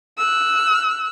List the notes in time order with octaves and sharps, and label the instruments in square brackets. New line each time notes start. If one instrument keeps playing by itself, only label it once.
[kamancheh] E6 F#6